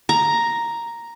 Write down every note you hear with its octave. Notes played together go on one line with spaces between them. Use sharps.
A#5